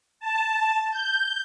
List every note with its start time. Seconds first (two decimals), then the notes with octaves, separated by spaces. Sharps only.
0.20 A5
0.91 G6